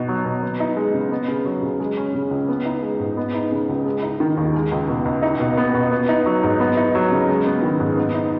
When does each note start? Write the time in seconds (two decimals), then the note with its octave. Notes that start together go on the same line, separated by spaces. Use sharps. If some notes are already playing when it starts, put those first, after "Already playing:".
Already playing: B2 D#4
0.08 F#3
0.25 B2
0.43 B3
0.60 D#4
0.77 G#3
0.94 C#3
1.11 B3
1.28 C#3
1.45 F#3
1.63 C#3
1.80 G#3
1.97 C#4
2.14 C#3
2.31 C#2
2.49 B3
2.65 D#4
2.83 G#3
2.99 G#2
3.17 B3
3.34 D#4
3.52 C#3
3.69 C#2
3.86 G#3
4.03 D#4
4.20 D#3
4.37 D#2
4.54 G#3
4.71 C#2
4.89 B2
5.05 C#2
5.22 D#4
5.40 B2
5.57 B3
5.74 B2
5.92 B3
6.09 D#4
6.26 F#3
6.43 G#2
6.60 B3
6.77 D#4
6.95 F#3
7.12 C#3
7.29 G#3
7.46 B3
7.63 D#3
7.80 G#2
7.97 B3
8.14 D#4